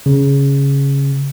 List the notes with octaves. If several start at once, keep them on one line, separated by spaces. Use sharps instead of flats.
C#3